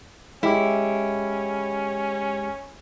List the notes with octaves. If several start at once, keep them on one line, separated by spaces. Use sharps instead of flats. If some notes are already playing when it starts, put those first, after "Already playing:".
G#3 C#4 E4 G4